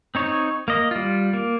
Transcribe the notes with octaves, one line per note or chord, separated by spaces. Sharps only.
C4 D#4 C#5
A#3 D#5
G3 F4
A#3